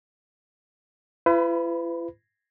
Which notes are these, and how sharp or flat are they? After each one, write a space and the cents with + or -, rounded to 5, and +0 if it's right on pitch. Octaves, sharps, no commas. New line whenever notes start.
E4 +45 B4 +35 B5 -10